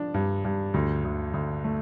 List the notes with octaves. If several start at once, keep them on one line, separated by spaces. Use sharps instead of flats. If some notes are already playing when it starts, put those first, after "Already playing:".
Already playing: F3 D4
G2
G2
D2
D2
D2
A3